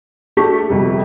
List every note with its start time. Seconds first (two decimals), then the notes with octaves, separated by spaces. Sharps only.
0.37 A3 D4 G4 A5 C#6 B6
0.69 G1 F2 C3 G3